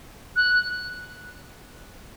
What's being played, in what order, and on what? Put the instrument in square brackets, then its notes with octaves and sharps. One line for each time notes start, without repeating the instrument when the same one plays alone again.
[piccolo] F#6